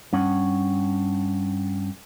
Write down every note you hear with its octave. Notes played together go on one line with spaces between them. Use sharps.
G2 C#4 F#5